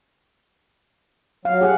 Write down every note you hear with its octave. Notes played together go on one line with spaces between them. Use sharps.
F#3 F5
G4 G#4 F#5